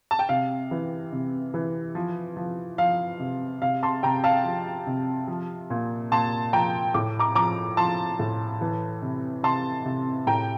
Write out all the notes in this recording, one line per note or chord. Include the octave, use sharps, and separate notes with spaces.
A5
G5
C3 F5
E3
C3
E3
F3
F3
F3 F5
C3
C3 F5
A5 C6
C3 G5 A#5
F5 A5
F3
C3
F3
A#2
A#2 A5 C6
F3 G5 A#5
A2 D6
A#5 D6
F3 A#5 D6
F3 A5 C6
A2
E3
C3
C3 A5 C6
C3
A2 G5 A#5